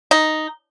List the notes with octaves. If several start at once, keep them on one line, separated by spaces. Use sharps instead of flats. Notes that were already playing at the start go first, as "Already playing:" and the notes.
D#4